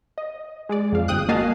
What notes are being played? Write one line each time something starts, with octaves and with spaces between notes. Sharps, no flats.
D#5
G#3 G#4 D5
F2 F5
G1 G5 D#6 F#6
A#3 F#4 D#5 F5 G#5 A5